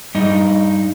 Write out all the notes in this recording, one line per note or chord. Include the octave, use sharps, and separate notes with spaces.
G2 D#4